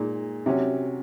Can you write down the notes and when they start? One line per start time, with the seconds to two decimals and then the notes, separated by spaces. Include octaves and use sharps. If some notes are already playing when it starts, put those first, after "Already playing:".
Already playing: A#2 G#3 D#4
0.46 C3 F#3 C#4